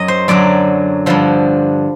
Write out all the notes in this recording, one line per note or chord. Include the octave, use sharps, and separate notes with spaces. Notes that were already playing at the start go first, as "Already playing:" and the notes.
Already playing: F#2 F#3 D#5
C5
F#2 D3 F#3 D5
G2 D3 F3